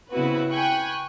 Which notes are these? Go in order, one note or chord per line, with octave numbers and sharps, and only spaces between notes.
C#3 B3 C4 E4 F#4 B4
G5 G#5 B5 C#6 F#6